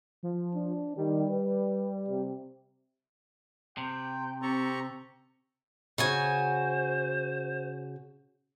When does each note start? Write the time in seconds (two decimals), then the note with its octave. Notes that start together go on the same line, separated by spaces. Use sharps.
0.23 F3
0.55 D4
0.96 D#3 G3
1.30 B4
2.08 C3
3.77 C3 G5
4.43 C4 G4 A4 A#5 C#6
5.98 C#3 F#4 C5 G#5